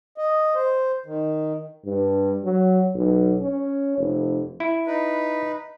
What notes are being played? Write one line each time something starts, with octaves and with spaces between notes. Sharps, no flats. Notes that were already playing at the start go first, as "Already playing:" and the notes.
D#5
C5
D#3
G2
F#3
B1
C#4
F1
E4
D#4 B4